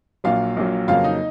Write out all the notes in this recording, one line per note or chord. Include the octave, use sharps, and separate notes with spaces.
A#1 A#2 F#3 F4 F5
A#1 A#2 F#3
F2 C#3 F#3 A#3 F4 F5
D#4 D#5